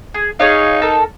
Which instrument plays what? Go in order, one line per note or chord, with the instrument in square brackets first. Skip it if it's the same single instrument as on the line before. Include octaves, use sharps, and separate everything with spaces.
[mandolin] G#4
[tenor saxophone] D#4 [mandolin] G#4 C#5 F5
[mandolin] A4 A#4 A5